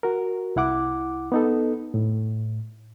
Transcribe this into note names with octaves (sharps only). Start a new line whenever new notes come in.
F#4 A#4
C2 E4 F#5 D6
B3 D#4 A4
A2